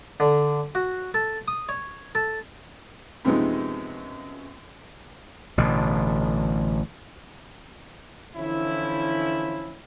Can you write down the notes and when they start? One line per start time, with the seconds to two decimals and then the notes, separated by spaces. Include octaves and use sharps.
0.20 D3
0.75 F#4
1.14 A4
1.48 D#6
1.69 C#5
2.15 A4
3.25 F#2 C3 F3 G#3 B3 D#4
5.58 A1 B2 D3
8.36 D3 E3 F3 C#4 E4